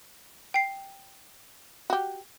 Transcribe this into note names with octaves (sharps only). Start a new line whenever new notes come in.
G5 C7
F#4 G4